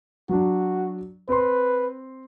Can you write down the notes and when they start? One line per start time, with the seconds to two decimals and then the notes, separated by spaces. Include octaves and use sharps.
0.29 F#3 D4 F#4
1.29 C4 B4 C6